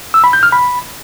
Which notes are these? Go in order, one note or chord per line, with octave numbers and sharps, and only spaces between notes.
E6
B5
G6
F6
B5